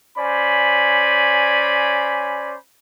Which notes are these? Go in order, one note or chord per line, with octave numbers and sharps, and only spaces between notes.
C#4 C5 D5 G#5 B5